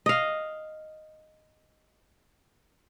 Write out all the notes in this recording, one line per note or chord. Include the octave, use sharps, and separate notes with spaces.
D#5 F5